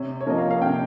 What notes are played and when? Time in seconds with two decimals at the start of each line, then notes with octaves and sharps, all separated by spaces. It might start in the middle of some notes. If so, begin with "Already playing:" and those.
Already playing: C3 C#5
0.21 C#5
0.26 F3 A#3 C#4 D#5
0.38 F5
0.51 F5
0.62 C3 G5